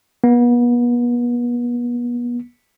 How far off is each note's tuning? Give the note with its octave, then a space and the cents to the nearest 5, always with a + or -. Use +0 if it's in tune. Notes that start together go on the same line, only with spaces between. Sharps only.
B3 -35